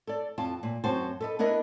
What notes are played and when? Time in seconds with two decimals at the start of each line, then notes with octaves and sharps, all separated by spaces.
0.07 A4 D5
0.38 F2 F4 A5
0.63 A#2
0.84 F#2 C4 F#4 C5 A5
1.21 A4 B4 D#5
1.39 B3 D4 E4 A#4 D#5